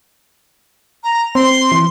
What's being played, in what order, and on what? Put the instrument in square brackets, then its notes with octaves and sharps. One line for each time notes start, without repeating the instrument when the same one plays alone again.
[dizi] A#5
[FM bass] C4 [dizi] C6
[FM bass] E3